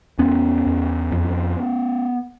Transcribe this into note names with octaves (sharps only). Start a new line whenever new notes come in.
E2 B3 C#4
E2
F2